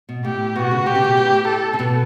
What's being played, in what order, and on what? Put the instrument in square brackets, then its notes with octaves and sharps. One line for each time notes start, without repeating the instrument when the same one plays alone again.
[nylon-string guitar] B2
[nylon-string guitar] A2 [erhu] G4
[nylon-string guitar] B2 [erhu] F#4
[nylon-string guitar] C#3
[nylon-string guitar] B2 [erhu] G4
[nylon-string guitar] C#3
B2
A2
[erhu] A4
[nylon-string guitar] C#3
B2